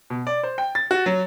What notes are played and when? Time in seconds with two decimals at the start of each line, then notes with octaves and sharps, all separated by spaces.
0.10 B2
0.27 D5
0.43 C5
0.58 G5
0.75 A6
0.91 F#4
1.06 F#3